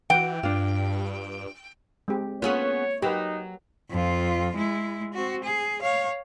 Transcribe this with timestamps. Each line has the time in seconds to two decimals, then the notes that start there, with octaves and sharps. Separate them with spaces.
0.10 E3 F#4 F#5 G5
0.43 G2 D4 F4
2.08 G#3 C4 G4
2.42 A#3 B3 C#4 F4 G#4 C#5
3.02 F#3 D#4 G4 A#4 B4
3.90 F2 F4
4.56 G#3 E4
5.14 C4 F#4
5.44 G#4
5.82 C#5 F5